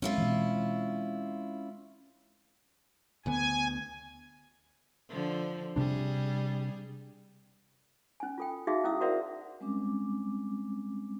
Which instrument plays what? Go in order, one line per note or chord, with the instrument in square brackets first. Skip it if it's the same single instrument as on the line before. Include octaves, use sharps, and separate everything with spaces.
[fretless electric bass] G#3 C4 [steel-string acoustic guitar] C#4 E4 F4
[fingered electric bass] B2 E3
[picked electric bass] D2 D3 B3 [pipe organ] G#5
[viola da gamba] D3 F3
[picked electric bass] C3 D4 [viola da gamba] G3 G#4
[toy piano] C#4 G#5
F4 A4 G5
D#4 F#4 G#4 E5 F5
C#4 E4 D#6 E6
F#4 A#4 C5 D5 E5 F#5
[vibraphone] G3 G#3 C4 C#4 D6